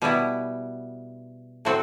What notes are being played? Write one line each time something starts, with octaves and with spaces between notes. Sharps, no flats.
B2 G3 B3 E4
A2 F#3 C4 F#4 A4